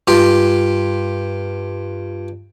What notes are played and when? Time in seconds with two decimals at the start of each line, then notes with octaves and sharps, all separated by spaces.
0.07 G2 F4 G4